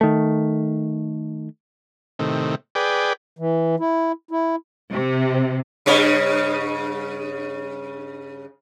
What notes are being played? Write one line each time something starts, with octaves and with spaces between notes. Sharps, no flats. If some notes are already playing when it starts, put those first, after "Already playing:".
D#3 A3
A2 C3 D#3
G#4 B4 D5 G5
E3
E4
E4
C3
G2 C#3 C#5